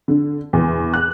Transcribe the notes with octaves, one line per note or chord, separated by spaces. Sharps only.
D3
E2
F#6